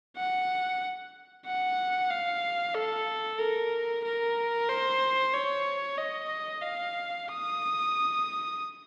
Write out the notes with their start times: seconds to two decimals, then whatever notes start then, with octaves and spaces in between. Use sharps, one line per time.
0.17 F#5
1.46 F#5
2.10 F5
2.75 A4
3.40 A#4
4.05 A#4
4.69 C5
5.33 C#5
5.98 D#5
6.62 F5
7.28 D#6